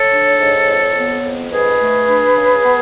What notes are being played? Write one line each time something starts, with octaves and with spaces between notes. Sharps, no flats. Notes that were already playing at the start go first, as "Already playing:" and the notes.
Already playing: A4 C#5
D4
G#2
F2
B3
F2
G#2 G#4 B4
A3
D4
C#3
B3